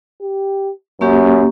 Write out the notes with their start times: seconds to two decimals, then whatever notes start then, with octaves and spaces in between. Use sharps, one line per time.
0.21 G4
1.01 F#2 A#3 C#4 G4